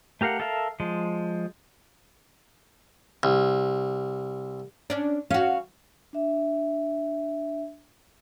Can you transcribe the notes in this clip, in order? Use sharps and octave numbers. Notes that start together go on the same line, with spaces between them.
A3 G4 A#4 F5 F#5
A4 A#4 E5 F5
F3 G#3
C2
C#4 D4
C#4 F#4 F5
D4 E5